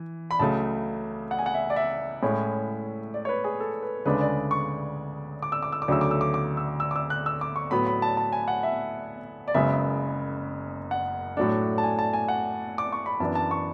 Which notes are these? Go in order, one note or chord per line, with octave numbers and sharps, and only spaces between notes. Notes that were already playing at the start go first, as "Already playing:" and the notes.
Already playing: E3
B5
C#2 C#3 F#3 A3 A5
F#5
G#5
F#5
E5
D5
E5
A2 G#3 C#4 E4
D5
C#5
B4
G#4
A4
B4
D2 C#3 G#3 D4 B4
D5
C#6
D6
E6
D6
E6
D6
D2 C#3 F#3 A3 E6
D6
E6
D6
D6
E6
E6
D6
E6
F#6
E6
D6
C#6
A2 F#3 B3 B5
B5
A5
A5
G#5
F#5
E5
D5
F#1 F#2 C#3 G#3 B3 E5
F#5
A2 F#3 A3 D4
A5
G#5
A5
G#5
F#5
D6
C#6
B5
F#2 E3 B3 D4 A5
A5
C#6